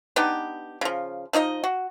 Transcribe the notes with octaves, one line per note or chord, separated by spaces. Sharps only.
B3 D4 D#4 G4
C#3 F3
F3 D#4 G4 D#5
F#4